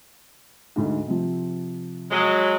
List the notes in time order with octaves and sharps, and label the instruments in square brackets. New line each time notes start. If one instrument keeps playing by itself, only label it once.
[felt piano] D2 G#2
C3 F3
[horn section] F#3 G#3